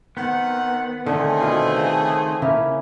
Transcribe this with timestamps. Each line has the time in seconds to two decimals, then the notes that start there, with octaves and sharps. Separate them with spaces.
0.17 D#3 B3 C4 F#5
1.06 D3 D#3 A3 C4 C#4 G#4
1.40 B2 F4 B4
1.77 C#3
2.42 C#3 A#3 C#4 E4